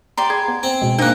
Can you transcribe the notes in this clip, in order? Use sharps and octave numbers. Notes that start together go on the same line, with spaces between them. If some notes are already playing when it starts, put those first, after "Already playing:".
G4 D5 A#5 C6
G#4 G#5 B5 G#6
B3
C4
B2 G#3
G#2 A#3 D4 D#4 F#6